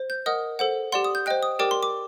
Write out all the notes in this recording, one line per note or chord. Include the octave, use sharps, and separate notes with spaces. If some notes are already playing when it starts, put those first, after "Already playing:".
Already playing: C5
G6
A#4 D#5 F#5 D#6
A4 C5 F#5
G4 D5 F#5 C6
D#6
G6
C5 D#5 G5 F#6
D#6
G4 A#4 D5 G5 D6
C6
D6